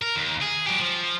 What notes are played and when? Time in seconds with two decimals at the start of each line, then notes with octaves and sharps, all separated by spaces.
0.02 A#4
0.16 D#2
0.42 G#4
0.67 F#3 G4
0.79 F3